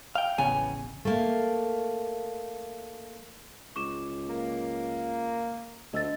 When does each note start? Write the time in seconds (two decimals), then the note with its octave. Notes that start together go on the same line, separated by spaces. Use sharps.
0.16 F5 G5
0.38 D1 A1 C#3 E3 B3 C#5 G#5
1.05 A3 A#3
3.76 C#2 C#6 D6 E7
4.29 A#3
5.93 D2 D#5 E6 A6